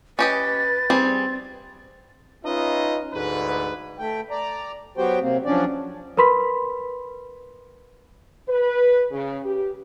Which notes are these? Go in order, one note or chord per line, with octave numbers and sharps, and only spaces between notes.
C#4 G4 B4 D#5 A6
G3 C4 G#4
C#4 D#4 F4 B4 D#5 E5
D2 G#2 B4
A3 G5
D5 A#5
F#3 B3 F#4 G4 C5 G5
C3 A#3 C4
F3 F#3 C#4 D4 D5
A#4 B4 B5 C6 B6
B4
C#3
G4